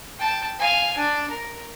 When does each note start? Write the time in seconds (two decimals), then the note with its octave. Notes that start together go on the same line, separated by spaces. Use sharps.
0.19 G5 A5
0.59 F5 G#5
0.97 D4
1.30 A#4